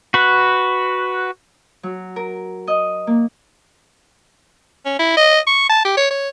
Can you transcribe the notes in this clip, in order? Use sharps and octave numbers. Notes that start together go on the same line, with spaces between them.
F#4 B4
F#3
A#4
D#5
A#3
C#4
E4
D#5
C#6
A5
G4
C#5
C#5